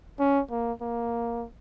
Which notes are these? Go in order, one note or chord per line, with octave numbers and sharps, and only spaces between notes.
C#4
A#3
A#3